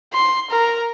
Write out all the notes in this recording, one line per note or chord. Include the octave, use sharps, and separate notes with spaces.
C6
A#4